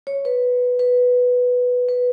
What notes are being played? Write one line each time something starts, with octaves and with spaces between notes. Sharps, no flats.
C#5
B4
B4
B4